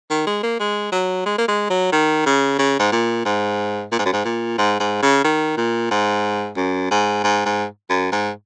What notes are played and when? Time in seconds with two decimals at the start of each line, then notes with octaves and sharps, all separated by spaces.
0.10 D#3
0.26 G#3
0.43 A#3
0.60 G#3
0.92 F#3
1.26 G#3
1.38 A#3
1.48 G#3
1.70 F#3
1.92 D#3
2.26 C#3
2.59 C#3
2.79 G#2
2.92 A#2
3.25 G#2
3.92 A#2
3.99 G#2
4.05 F#2
4.13 G#2
4.25 A#2
4.58 G#2
4.80 G#2
5.02 C#3
5.24 D#3
5.57 A#2
5.91 G#2
6.57 F#2
6.91 G#2
7.24 G#2
7.45 G#2
7.90 F#2
8.12 G#2